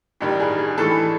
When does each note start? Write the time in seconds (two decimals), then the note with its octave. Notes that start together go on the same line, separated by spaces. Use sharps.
0.20 A1 G2 D#3 G3 G4
0.40 G#4
0.58 G#4
0.78 A2 E3 G#3 A4